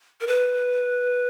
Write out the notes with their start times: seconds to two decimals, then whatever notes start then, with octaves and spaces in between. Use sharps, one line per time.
0.21 A#4
0.27 B4